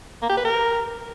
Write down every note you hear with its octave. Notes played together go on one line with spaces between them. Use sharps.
A#3
G4
B4
A#4